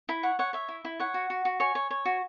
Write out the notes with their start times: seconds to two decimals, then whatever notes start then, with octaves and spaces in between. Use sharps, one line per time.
0.09 E4 B5
0.23 C#5 F#5
0.39 C#5 F#5
0.53 C#5 E5
0.69 E4
0.85 E4
1.00 C#5 F#5
1.14 F#4
1.30 F#4
1.45 F#4
1.60 C#5 G#5
1.75 C#5
1.91 C#5
2.05 F#4